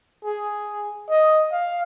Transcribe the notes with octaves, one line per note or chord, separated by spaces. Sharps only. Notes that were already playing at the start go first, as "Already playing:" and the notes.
G#4
D#5
F5